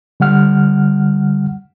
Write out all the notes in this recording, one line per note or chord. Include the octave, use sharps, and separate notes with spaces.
D3 G3 F#5 F6